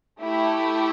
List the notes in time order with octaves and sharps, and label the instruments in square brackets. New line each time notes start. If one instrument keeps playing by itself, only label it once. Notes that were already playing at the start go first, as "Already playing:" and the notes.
[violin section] A3 E4 G4